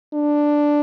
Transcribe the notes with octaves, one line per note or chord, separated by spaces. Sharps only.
D4